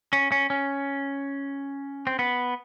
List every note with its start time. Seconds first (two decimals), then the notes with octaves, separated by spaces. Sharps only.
0.13 C#4
0.32 C#4
0.50 C#4
2.07 C4
2.19 B3